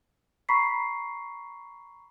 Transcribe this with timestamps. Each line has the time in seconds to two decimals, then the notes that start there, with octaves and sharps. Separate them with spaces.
0.49 A#5 B5 C#6 B6 C7